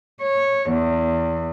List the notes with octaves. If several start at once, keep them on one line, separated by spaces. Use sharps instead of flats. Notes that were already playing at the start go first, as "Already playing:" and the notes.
C#5
E2